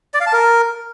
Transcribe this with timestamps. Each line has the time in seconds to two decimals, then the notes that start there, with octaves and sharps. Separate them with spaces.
0.14 D5
0.20 F5
0.27 A5
0.33 A#4